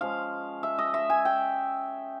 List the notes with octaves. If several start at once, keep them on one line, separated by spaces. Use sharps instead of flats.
F3 G#3 C#4 F5
E5
D#5
E5
G#5
G5